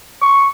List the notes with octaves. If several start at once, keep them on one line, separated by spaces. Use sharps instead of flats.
C#6